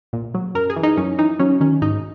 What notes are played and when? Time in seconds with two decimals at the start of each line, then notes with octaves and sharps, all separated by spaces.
0.13 A#2
0.34 F#3
0.55 F#2 A#4
0.70 G#4
0.76 E3
0.83 D#4
0.97 F#2 C#4
1.19 E3 D#4
1.39 F#3 C#4
1.60 D#3 C#4
1.82 G#2 D#4